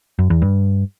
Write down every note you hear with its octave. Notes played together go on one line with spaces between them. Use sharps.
F#2
E2
G2